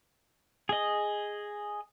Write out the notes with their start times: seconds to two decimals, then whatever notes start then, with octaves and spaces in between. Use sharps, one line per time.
0.69 G#4 D#5